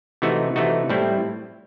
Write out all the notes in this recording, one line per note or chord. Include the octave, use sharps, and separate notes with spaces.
C3 E3 A3 D#4 F#4
C3 E3 A3 D#4 F#4
A2 G3 C4 E4